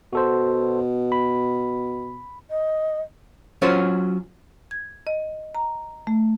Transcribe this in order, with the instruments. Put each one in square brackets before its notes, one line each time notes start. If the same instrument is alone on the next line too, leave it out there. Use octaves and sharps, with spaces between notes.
[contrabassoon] B2 [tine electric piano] F#4 A4 C5
[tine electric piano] B5
[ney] D#5
[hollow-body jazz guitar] F#3 C#4 F4 F#4 C5 C#5
[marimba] G#6
D#5
A#5
A3